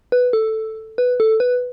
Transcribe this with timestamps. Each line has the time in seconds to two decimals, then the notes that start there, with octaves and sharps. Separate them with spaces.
0.12 B4
0.33 A4
0.98 B4
1.20 A4
1.40 B4